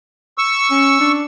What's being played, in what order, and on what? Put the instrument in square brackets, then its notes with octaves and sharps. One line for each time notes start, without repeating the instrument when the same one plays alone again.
[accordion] C#6 E6
[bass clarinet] C#4
D4